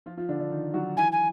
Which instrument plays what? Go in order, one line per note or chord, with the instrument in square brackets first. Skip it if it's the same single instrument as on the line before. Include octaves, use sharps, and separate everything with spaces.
[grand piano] F3 F4
F3 F4
D3 D4
D3 D4
D#3 D#4
F#3 F#4
[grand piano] E3 E4 [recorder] G#5
[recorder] G#5